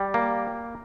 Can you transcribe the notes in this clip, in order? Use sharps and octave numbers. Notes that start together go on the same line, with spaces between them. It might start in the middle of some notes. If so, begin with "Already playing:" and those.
Already playing: G3
A#3